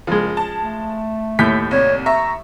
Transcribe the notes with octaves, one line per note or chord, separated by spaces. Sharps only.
F#1 F3 G#3
A5
A3
D#2 A2 G6 B6
C2 C#5
E5 A#5 C#6